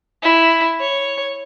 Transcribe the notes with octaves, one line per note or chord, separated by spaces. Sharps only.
E4
C#5